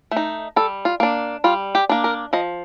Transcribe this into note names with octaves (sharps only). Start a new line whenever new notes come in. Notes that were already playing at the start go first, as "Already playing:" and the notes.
A3
D#4
G3 A4
F4
A#3 D4
G3 F4
G4
A#3 D4
A#4
F3 D#5